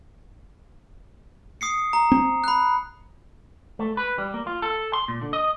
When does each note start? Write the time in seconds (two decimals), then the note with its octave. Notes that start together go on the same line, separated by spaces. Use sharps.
1.61 D#6 C7 C#7
1.93 A#5
2.12 C4
2.44 B5 F#6
3.79 A3
3.97 B4
4.18 G3
4.34 A#3
4.47 F4
4.62 A4
4.93 C6
5.08 A#2
5.22 D3
5.33 D#5